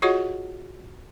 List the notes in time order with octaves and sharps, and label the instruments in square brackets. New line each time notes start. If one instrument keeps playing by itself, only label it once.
[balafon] F4 F#4 G#4 C#5 D#5 F#5